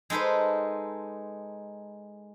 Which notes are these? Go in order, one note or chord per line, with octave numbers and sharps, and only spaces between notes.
G#3 D#4 A4 B4 C5